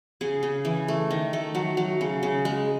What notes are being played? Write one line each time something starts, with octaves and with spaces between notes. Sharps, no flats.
C#3 G#4
C#3
E3
A3
D#3
A3
F#3
F#3
C#3
C#3
G#3